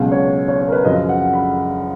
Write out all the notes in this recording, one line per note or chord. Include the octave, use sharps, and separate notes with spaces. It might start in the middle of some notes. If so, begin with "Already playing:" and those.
Already playing: C#2 B2 F#3
C#5
C#5
C#5
A#4
B4
F#2 C#3 F3 D#5
F#5
B5